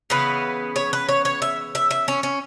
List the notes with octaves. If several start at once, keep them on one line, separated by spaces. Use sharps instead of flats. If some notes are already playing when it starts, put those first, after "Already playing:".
C#3 E3 B3 B4
C#5
B4
C#5
C#5
E5
E5
E5
C#4
C#4